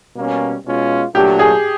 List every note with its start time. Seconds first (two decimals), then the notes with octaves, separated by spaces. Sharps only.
0.16 B2 G3 A#3 C#4
0.65 B2 G#3 C#4 F4
1.15 A#2 F#3 A3 D4 G4
1.39 G#4